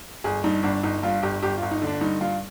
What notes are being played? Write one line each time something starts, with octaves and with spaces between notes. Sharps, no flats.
G1 G#4
G2 D#4
G1 D4
G1 D#4
G2 F4
G1 G4
G1 G4
G1 F4
D#4
D3
D4
G2 D#4
G2 F4